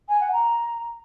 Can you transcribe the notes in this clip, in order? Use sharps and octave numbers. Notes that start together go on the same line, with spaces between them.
G#5
F#5
A#5